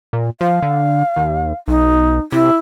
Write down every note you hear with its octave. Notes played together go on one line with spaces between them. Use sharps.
A#2
F3 F5
D3
D#2
B1 D#4
C3 E4